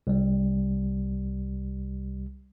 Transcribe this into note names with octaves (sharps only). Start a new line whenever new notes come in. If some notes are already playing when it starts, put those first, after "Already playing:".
C2 G3